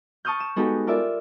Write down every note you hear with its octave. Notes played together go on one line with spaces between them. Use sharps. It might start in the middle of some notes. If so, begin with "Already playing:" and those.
A5 C#6 D#6 F6 G6
E7
G#3 B3 D#4 F#4 G4 A4
F4 A#4 D5 E5